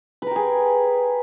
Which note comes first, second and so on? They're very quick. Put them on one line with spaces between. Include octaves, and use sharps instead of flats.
B4 A#4 G4 G#4